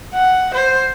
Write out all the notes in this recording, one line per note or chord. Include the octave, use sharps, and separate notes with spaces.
F#5
C5